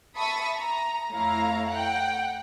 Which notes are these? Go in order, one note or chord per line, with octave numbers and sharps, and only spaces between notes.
E5 A5 B5 C#6 D#6
A#5
F2 A3 E4 C#5 F5 A#5
F#5 G5